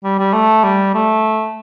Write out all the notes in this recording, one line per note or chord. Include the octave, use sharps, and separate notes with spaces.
G3
G3
A3
G3
A3